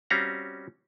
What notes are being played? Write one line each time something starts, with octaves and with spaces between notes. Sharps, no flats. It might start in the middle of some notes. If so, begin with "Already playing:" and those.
G3 C4 C#4 F#4 F5 A#5